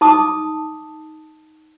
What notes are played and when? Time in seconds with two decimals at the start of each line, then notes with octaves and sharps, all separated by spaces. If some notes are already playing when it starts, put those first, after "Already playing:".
0.01 D#4 A5 D6 D#6